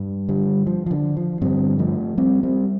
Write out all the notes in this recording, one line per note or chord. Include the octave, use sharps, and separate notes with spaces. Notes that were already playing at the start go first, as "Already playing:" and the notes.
Already playing: G2
D3 G3
F3
F3
D3
F3
G2 D3 G3 C4
F3 A3
G3 C4
G3 C4